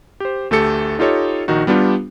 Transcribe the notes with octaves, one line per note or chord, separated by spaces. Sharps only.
G4 C5
D2 A3 G4 A4 C#7
D#4 F4 G4 A4 C#5 D#5
A#1 D#3 D#4 F#4
G3 B3 D4 F4 G4